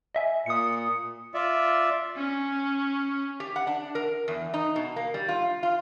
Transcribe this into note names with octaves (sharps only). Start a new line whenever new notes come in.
D#5 E5 G#5
A#2 D#6 C#7
F4 D5 E5
C#4
G4
F#5
D4
A#4
E2
D#4
B2
A#3
G3
F4
F4